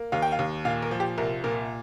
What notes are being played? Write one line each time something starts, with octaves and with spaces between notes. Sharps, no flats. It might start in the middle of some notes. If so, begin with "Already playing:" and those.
Already playing: A#3
D#2 F5
G5
F5
D#2
A#2 F5
A#4
F3
G4
C2 A#4
A#2 A#4